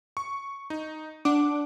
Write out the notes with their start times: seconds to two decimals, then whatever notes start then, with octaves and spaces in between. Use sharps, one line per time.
0.17 C#6
0.70 D#4
1.25 D4 F#5 D6